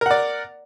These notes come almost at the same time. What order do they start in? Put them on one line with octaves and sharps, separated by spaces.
A#4 F#5 D5